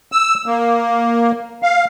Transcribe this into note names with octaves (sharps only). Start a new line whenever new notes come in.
E6
A#3
F5